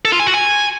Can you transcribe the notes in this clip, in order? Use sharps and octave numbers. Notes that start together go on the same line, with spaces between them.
A4
F4
G#5
F#4
G#5